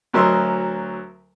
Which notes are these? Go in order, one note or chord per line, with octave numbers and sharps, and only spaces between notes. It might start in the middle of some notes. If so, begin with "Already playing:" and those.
D2 F#3 A#4 D#5 E5 C6